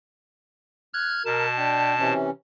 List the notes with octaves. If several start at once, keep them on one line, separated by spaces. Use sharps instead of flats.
F6 F#6 G#6
B2 A#4 A5
D4 G5
C3 E3 C#4